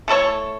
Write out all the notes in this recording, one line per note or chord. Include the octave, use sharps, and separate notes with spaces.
A3 E4 A4 C#5